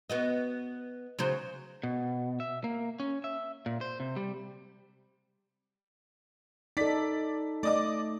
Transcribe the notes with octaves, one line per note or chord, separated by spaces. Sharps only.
B3 F#4 D#5
C#3 F#3 C5
B2
E5
A#3
C#4
E5
A#2
C5
C3
G3
D#4 A4 D5 B6
A3 D5 D#5 D6